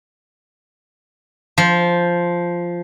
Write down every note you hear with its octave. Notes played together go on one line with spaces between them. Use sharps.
F3